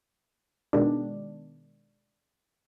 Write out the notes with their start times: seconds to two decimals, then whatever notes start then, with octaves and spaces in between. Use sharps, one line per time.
0.73 B2 D#3 G#3 D4